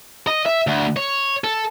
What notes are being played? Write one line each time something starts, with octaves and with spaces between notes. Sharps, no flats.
D#5
E5
D2
C#5
A4